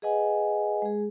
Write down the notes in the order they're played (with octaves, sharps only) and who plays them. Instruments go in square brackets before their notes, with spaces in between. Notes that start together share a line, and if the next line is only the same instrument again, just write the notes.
[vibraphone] G#4 B4 D#5 F#5 G#5
G#3 G#4